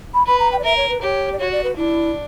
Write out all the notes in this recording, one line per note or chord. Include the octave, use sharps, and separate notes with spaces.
B5
B4 B5
A#5
G5
D5
A#4 E5
C#5
B4
G4 C#5
D5
F#4 C#5
D5
B4
D4 E4